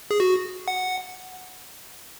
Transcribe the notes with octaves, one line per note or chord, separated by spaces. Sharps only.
G#4
F#4
F#5